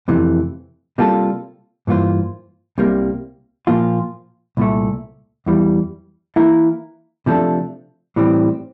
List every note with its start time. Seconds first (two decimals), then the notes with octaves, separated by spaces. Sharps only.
0.08 F2 C3 E3 A3
0.98 C3 G3 A#3 F4 A4
1.87 G2 E3 A#3 F4 C5
2.78 C2 C3 G3 A#3
3.67 A#2 F3 A#3 F4
4.57 C2 A#2 A3
5.46 E2 E3 G3
6.36 E3 A#3 E4 A#4
7.26 C3 F3 A3 D4 A4
8.16 A2 E3 G3 C4